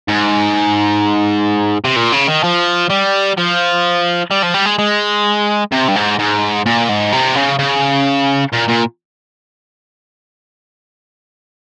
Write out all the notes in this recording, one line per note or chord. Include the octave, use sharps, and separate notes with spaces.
G#2
C3
A#2
C#3
D#3
F3
G3
F3
G3
F3
G3
G#3
G#3
C3
G2
G#2
G#2
A#2
G#2
C3
C#3
C#3
A#2
A#2